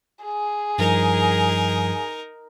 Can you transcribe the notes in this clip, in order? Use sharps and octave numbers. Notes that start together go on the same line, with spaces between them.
G#4
G2 F3 G3 D#4 A#4